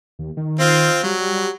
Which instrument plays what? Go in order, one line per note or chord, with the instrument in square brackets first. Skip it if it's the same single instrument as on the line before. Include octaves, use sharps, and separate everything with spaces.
[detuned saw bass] D#2
D#3
[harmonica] C4 F4
[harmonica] F#3 [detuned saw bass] G3